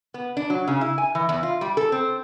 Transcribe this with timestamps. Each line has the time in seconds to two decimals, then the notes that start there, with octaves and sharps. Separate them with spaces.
0.14 B3
0.37 D4
0.50 F#3
0.67 C#3
0.81 E4
0.98 G#5
1.15 E3
1.29 E2
1.43 F4
1.61 G3
1.77 A4
1.92 C4